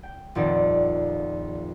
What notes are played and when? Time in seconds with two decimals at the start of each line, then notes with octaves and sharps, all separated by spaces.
0.03 G5
0.35 D#1 A#1 F2 D#4 D5